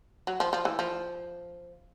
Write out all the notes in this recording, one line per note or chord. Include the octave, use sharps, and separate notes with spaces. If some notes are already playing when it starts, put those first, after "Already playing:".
F#3
F3
F3
E3
F3